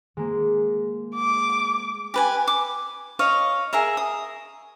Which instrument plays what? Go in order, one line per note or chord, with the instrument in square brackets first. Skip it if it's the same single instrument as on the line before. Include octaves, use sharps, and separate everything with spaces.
[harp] G#3 A#3
[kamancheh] D6
[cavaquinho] G4 B4 G#5
D6
C#5 D#5 F5
G#4 A#4 E5 A#5
D#6